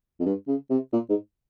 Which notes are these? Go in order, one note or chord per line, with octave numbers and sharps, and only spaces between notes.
F2
G2
C#3
C3
A#2
G#2